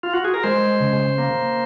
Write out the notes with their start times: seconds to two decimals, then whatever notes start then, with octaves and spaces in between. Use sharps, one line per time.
0.03 F4
0.13 F#4
0.25 G#4
0.34 A#4
0.43 G#3 C5
0.80 C#3
1.18 A#3